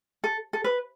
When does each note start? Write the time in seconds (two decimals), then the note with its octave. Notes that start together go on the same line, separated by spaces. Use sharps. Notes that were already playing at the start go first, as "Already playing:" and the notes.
0.24 A4
0.53 A4
0.64 B4